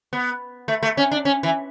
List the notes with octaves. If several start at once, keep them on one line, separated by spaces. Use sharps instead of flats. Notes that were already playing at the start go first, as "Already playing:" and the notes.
B3
A3
A3
C#4
D4
C#4
E3